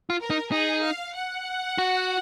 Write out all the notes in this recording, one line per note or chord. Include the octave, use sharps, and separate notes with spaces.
F4
A#4
D#4
D#4 G#4
F5
F#5
F#4